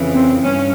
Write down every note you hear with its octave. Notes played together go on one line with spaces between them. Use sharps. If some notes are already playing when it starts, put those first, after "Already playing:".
Already playing: F2 C#3 E3
C4
G2 C#4